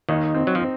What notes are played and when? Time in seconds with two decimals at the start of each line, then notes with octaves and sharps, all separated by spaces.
0.09 D#2 D#3 D#4
0.35 C4
0.47 F#3
0.55 F3
0.60 C4